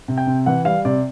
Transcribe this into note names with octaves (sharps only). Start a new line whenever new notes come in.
C3
G5
C3
E3 F#5
G3 F5
C3 D5